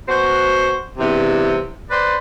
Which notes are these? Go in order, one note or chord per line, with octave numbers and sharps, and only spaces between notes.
B2 F#4 C5
E2 G2 C3
B4 C5 D5